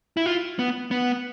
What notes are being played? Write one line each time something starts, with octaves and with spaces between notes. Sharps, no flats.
E4
F4
B3
B3